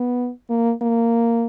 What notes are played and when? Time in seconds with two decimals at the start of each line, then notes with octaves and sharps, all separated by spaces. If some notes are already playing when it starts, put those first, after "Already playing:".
Already playing: B3
0.50 A#3
0.82 A#3